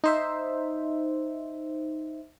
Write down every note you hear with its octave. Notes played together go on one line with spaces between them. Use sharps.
D#4 C5 E5